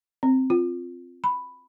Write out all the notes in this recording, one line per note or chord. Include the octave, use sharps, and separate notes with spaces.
C4
F4
B5